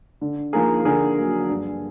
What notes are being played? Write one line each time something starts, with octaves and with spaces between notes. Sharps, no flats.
D3
F3 A#3 D#4 G#4 A#4
D3 G#4 A#4
F#3 A#3
G2